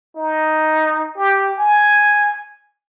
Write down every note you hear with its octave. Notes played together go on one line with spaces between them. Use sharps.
D#4
G4
G#5